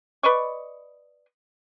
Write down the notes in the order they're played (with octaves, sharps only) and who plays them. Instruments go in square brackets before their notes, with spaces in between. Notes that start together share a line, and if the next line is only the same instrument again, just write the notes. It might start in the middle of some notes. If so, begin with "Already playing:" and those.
[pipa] B4 D5 D#5 C#6